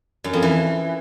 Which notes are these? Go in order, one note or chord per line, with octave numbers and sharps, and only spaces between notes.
F#2
F2
E3